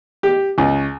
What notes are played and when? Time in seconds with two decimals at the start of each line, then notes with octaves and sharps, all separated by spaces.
0.23 G4
0.58 C#2